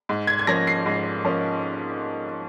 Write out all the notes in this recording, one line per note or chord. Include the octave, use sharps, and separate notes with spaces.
G#2
G#6
G#6
F3 A#3 C#4 A#6
C7
G#2
F3 A#3 C#4